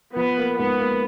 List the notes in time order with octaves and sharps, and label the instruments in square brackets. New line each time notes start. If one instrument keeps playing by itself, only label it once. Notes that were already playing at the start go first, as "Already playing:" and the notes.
[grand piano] F3 [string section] B3
[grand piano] A#3
[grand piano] G#2 [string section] B3
[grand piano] A#3